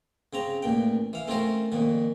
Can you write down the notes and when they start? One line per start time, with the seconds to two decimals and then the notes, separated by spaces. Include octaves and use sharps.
0.33 C#3 C4 A#5
0.62 A1 A#2 G5
1.13 E3 F5
1.28 A3 C4 C#4 F4 A#4 C5
1.72 F2 A#2 D#3